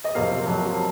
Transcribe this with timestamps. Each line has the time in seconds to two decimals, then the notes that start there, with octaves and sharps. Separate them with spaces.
0.04 D#5
0.15 F2 C3 F#3 A#3 F5
0.46 F2 C3 F#3 A#3